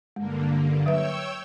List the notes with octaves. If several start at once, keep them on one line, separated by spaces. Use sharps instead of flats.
G2 D3 G#3 A#3
F#3 B4 C#5 E5 G5 E6